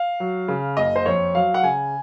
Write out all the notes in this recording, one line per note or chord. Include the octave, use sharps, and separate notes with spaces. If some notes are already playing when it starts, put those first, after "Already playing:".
Already playing: F5
F#3
C#3
F#1 D#5
C5
F2 C#5
F#3 F5
F#5
C#3 G#5